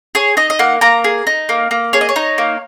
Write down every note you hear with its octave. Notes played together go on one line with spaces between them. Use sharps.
G#4 C#5
D#4 D#5
D#5
A#3 F#5
A#3 A#5
G#4
D#4
A#3
A#3
G#4 C#5
D#5
C#5
D#4
A#3